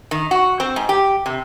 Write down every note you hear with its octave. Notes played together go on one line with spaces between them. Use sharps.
D#3
F#4
C4
G#2
G4
C3